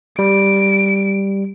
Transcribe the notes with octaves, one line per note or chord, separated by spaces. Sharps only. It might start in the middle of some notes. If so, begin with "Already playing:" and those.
G3 D7